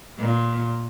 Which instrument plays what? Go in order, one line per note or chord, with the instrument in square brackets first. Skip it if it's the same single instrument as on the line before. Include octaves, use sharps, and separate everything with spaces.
[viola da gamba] A#2